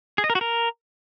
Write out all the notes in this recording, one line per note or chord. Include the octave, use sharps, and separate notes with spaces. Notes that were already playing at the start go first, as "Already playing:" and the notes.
G#4
D#5
A#4
F#4
A#4